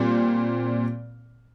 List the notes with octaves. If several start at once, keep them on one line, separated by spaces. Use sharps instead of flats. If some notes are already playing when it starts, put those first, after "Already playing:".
Already playing: A#2 G3 C4